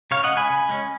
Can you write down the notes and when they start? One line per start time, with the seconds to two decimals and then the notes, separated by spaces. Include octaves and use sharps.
0.11 C#3 C#5 F5
0.24 D#5 F#5
0.31 G#3 C#4
0.37 G#5 B5
0.50 C#3
0.69 G#3 C#4